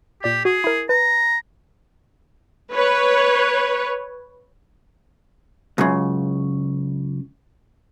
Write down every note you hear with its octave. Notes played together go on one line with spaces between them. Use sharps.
A#2 G4 D5 G6
F#4 G#4
E4 A#4
B4 A#5
B4 C#5
C#2 F#2 C#3